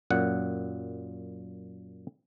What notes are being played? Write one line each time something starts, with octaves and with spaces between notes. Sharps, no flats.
F#2 A#2 F#5